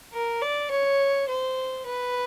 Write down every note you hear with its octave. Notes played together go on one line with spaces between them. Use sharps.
A#4
D5
C#5
C5
B4